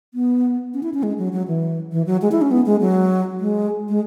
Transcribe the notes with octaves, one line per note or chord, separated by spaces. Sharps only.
B3
C#4
E4
C#4
G#3
F#3
F#3
E3
E3
F#3
G#3
E4
C#4
B3
G#3
F#3
G#3
G#3